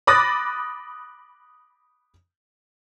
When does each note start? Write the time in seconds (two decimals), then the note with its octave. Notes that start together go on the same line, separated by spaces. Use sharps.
0.07 B5 D6 D#6 F#6 A6 A#6